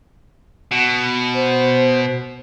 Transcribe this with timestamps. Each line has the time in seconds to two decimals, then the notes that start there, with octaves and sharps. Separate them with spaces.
0.71 B2
1.34 C5